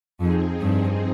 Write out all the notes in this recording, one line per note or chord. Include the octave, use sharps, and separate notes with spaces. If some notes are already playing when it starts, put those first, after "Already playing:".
F2 F3 C4 D#4 G#4
G2